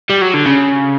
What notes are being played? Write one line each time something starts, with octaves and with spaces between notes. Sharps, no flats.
G3
F#3
D3
C#3